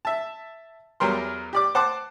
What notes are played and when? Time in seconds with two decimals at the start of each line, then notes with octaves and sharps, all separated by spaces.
0.05 E5 A5
1.00 E2 F#3 G3 A#4 C6
1.53 G4 D5 D6
1.75 C5 F#5 A5 D6